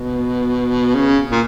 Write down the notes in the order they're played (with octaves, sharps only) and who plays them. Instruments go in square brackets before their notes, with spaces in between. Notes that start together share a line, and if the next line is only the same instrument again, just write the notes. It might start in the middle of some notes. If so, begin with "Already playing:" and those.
Already playing: [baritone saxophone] B2
C#3
A#2